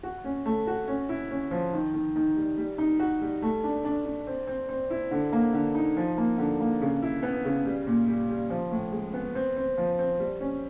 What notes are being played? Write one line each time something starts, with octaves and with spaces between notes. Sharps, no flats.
F#4
C#4
A3
F#4
C#4
E4
C#4
F3
D#3
D#3
D#3
G3
G3
D#4
F#4
G3
A3
D4
D4
D4
C4
C4
C4
E4
D3
A#3
D3
D#4
F3
A#3
D3
A#3
C#3
E4
B3
C#3
G3
A#2
G3
G3
F3
A2
G#3
B3
C4
C4
F3
C4
G3
C#4